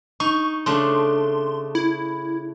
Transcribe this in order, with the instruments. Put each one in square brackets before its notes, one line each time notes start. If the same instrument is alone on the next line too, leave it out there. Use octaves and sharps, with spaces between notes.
[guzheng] D#4 [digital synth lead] C#6
[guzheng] C#3 A3 D4 [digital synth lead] C6
[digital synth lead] E4